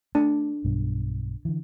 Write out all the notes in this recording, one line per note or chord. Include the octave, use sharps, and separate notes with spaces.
A3 D4
B1 G2 B2
D3 E3